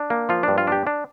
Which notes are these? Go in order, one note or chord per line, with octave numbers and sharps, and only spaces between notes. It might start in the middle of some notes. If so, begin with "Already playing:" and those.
Already playing: D4
A#3
F3 F4
G2 D4
F4
D4 G4
D4